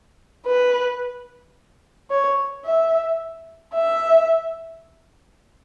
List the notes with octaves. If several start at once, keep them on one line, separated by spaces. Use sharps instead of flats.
B4
C#5
E5
E5